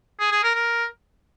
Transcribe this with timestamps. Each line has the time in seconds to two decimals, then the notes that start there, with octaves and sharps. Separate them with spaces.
0.20 G#4
0.31 G#4
0.43 A#4
0.55 A#4